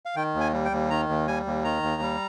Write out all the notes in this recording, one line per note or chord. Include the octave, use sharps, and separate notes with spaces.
F5
D#3 G5
D#2
G#5
G3
G5
D#2
D#3 A#5
D#2
G3 G#5
D#2
D#3 A#5
D#2
G3